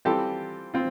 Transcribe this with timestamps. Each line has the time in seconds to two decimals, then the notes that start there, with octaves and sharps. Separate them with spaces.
0.05 E3 G3 C4 F4 G4 A4
0.74 C4 F4